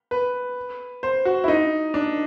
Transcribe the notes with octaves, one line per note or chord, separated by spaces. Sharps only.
B4
C5
F#4
E4
D#4
D4